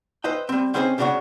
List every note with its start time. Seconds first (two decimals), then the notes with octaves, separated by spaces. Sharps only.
0.24 B4 C5 D#5 E5 G5
0.49 G3 C4
0.74 C4 C#4 E4 G#4 C5 D#5
0.98 C#2 C#3 D4 F4 F#4 C#5